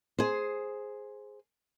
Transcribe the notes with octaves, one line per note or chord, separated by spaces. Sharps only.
G#4 C5